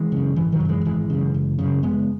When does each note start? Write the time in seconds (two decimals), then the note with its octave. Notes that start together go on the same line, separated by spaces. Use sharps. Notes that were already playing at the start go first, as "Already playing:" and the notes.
Already playing: E3 G#3
0.12 F#2 C#3
0.36 G#1 E3
0.52 D#3 F#3
0.60 F#2 C#3
0.69 E3 G#3
0.85 G#1 E3 G#3
1.10 F#2 C#3
1.34 F#1
1.59 F#2 C#3
1.83 F#1 G#3 B3